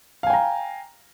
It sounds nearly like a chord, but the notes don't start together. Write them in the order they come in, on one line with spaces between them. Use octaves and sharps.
F5 G#5 G5 A#5